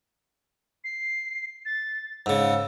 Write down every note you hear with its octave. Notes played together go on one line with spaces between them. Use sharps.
C7
A6
G#2 C#3 E6